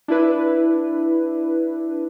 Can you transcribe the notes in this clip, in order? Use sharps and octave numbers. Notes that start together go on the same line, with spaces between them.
D4 E4 B4